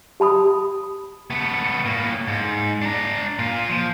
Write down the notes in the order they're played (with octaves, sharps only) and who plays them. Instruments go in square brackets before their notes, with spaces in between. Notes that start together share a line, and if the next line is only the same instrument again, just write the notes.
[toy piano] G4 A5 B5 D#6
[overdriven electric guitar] A3 B3
A2 A#3
G#2
D4 A#5
A#2 F4
F3